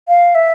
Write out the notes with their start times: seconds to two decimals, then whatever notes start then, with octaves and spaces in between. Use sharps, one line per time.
0.08 F5
0.35 E5